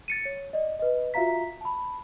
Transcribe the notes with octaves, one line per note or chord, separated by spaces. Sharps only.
A6 C#7 D#7
C#5
D5 D#5
B4 D#5
F4 F#4 E5 F5 A#5 B6
A5 B5